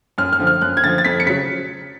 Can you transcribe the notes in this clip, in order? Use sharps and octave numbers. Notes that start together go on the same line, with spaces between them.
F#2 F6
F6
D3 F3
F6
F#2 F#6
G#6
D3 F3 A6
A6
F2 B6
C#7
C#3 F#3 B6